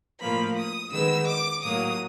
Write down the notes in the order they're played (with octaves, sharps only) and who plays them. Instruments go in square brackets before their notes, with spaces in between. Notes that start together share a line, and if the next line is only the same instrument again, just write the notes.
[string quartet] A2 F3 A#3 B5
D#6
D#3 G#3 B3 E6
D6
A2 F#3 A#3 D#6